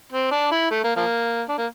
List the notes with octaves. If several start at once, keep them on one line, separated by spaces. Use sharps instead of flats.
C4
D4
E4
A3
A#3
F3 A#3
D4
A#3